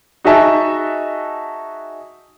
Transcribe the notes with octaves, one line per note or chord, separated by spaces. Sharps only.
D#4 F#4 G#4 D#5 E5 A5